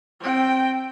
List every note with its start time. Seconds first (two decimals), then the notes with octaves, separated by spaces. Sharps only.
0.20 C4 G5